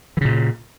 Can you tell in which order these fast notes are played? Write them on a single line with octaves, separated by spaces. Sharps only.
E3 C#3 A#2